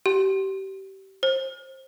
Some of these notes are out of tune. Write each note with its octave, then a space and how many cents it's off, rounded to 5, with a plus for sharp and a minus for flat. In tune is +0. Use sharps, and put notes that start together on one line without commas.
G4 -30
C5 +25